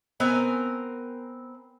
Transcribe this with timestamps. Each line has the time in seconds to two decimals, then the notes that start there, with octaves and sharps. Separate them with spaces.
0.20 B3 C4 A#4 G#5